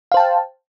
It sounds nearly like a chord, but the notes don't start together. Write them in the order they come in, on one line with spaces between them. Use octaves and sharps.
F5 C5 A5 G5